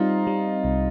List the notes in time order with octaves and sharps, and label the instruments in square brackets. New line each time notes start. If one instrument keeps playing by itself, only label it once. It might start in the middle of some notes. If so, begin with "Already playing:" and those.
Already playing: [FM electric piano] G3 C4 [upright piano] D#4 F4
[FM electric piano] G3
C2